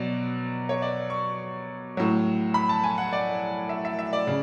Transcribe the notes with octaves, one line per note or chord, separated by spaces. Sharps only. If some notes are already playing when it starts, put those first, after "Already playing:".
Already playing: B2 F#3 D5
C#5
D5
C#6
A2 F#3
B5
A5
G#5
F#5
D5
E5
E5
E5
D5
C#3